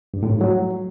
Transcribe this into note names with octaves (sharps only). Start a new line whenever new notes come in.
G2
A2
G#2
F#3